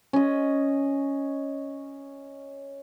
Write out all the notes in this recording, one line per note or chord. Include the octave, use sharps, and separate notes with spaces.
C#4 D#5